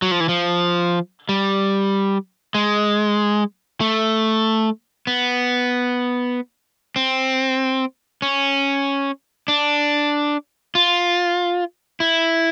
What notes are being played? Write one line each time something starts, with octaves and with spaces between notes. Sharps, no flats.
F#3
F3
E3
F3
G3
G#3
A3
B3
C4
C#4
D4
F4
E4